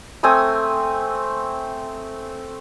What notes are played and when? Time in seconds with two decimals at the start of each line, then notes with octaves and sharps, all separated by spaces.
0.23 A3 C4 G#5 D#6